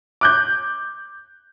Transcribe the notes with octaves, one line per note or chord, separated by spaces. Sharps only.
D6 F#6 G6